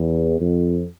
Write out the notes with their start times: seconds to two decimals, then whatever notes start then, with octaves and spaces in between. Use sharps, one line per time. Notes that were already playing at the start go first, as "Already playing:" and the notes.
Already playing: E2
0.40 F2